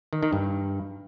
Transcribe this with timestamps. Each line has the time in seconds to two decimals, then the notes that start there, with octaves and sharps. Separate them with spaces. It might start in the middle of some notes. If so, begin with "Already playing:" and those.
0.13 D#3
0.23 D#3
0.33 G2